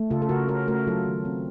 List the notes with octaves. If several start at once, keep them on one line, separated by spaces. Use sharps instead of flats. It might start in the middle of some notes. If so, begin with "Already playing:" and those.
Already playing: A3
C#3 F4 A4
A4
C#3 F#4 A#4
C#4 F#4 A#4
A3 F#4 A#4
F#3 F4 A4
D#3
C4